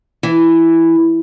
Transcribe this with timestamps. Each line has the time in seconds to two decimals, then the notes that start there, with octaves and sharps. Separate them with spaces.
0.23 E3